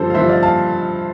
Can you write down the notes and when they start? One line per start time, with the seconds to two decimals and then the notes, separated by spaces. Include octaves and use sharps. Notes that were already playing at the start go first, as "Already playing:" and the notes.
Already playing: G2 D3 F3 A4 C5
0.10 F5
0.14 G2 D3 F3 C5 E5
0.29 D5 F5
0.43 F5 A5